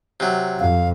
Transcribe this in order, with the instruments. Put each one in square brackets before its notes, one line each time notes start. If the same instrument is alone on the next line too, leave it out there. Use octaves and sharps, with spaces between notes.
[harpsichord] C3 F#3
[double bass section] F2 [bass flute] F5